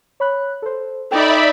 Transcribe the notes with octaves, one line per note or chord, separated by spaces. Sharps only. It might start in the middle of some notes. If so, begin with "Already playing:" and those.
C#5 B5 F#6
A4 C5
D#4 A4 D5 E5 G5 B5